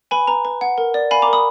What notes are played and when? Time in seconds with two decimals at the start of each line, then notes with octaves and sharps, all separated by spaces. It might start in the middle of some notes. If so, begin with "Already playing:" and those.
0.11 B4 G#5 B5
0.27 B4 A#5
0.45 B4
0.61 F#5
0.78 A#4
0.94 D5
1.11 F5 G#5 B5
1.22 A#5 D6
1.28 A#4
1.33 B5 D#6